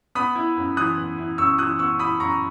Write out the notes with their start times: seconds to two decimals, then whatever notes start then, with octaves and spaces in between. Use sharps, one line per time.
0.15 B3 B5 D#6
0.35 E4
0.57 F#2
0.77 E3 D#6 F#6
0.98 B3
1.18 E4
1.38 F#2 C#6 E6
1.58 E3 D#6 F#6
1.79 B3 C#6 E6
1.99 E4 B5 D#6
2.20 F#2 A#5 C#6